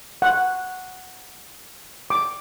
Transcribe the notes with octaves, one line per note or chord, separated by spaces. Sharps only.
F#5
D6